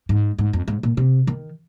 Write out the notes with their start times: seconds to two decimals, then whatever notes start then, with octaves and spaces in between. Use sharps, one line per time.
0.09 G#2
0.39 G#2
0.53 F2
0.68 G#2
0.83 A#2
0.97 C3
1.27 D#3